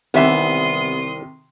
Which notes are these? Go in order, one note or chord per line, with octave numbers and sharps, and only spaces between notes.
C2 C3 D#3 E3 B3 E5 C6 D#6